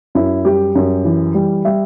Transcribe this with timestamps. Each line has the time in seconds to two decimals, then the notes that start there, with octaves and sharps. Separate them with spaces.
0.15 F#2 E4
0.45 G3 G4
0.75 F#2
1.05 E3
1.34 G3
1.65 G3 E5